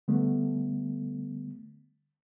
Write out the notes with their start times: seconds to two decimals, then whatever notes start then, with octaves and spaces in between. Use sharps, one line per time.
0.08 D3 G3 A3 B3